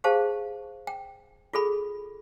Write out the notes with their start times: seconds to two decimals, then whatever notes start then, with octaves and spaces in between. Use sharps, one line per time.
0.04 G4 G#4 C5 F5 A5
0.87 G5
1.53 F4 G#4 A4 B5